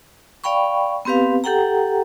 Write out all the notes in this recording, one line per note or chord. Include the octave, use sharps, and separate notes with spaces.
D5 F5 G5 B5 C#6
B3 C4 G4 B4 F5
G4 A4 F#5 G5 A#5